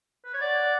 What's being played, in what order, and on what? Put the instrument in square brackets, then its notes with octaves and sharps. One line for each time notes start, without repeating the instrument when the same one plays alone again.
[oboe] B4
C#5
[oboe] D5 [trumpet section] F#5